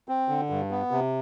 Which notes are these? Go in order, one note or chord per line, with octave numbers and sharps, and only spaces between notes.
C4
D3
G2
B3
C3